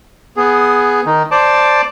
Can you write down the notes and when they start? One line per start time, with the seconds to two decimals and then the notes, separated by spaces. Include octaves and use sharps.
0.37 B3 G#4
1.06 D#3 D#4
1.32 C5 D5 A5 D6